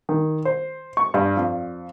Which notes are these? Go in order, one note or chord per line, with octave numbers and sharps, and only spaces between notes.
D#3
C5
C#6
G2
F2